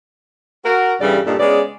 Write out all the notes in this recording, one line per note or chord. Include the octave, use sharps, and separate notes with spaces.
F#4 A#4
G2 C#3 E3 G3 A4 D5
G2 A#2 D4 D#4 G4 A4
C#3 G#3 B3 C#4 D5